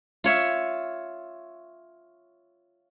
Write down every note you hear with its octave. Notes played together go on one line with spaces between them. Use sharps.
F4 C#5 E5